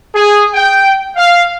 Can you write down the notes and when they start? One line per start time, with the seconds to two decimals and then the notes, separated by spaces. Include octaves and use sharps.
0.15 G#4
0.54 G5
1.16 F5